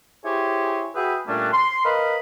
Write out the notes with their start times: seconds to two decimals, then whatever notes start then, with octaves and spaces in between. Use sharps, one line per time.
0.25 E4 G4 G#4 C5 C#5
0.95 F#4 G#4 B4 E5 G5 B5
1.27 A#2 G3 A3 C#4 D4
1.53 C6
1.84 A#4 B4 D#5 F5 B5